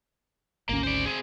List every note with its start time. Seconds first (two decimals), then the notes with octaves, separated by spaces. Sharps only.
0.69 G#1 D2 A#3 C#4
0.83 C5 D5
1.06 C4 G#4